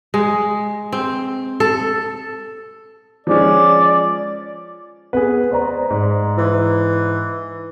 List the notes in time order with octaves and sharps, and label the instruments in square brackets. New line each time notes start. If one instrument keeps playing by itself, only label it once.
[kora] G#3
C4
A4
[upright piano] F3 G#3 C#4 [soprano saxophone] D5
[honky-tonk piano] B3 [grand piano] G#4 B4
[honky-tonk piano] C5 D5 A#5
[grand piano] G#2
[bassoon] E3